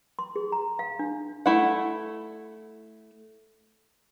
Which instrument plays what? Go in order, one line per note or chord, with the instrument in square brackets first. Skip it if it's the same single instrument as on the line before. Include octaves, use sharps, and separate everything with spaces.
[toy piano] C6
G#4
A#5
F5
D4
[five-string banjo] A3 E4 F#5